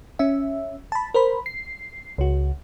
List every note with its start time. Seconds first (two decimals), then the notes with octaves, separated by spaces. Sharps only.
0.19 C#4 E5
0.92 A5 B5
1.14 A#4 C5 B5
1.46 C7
2.18 C#2 F#4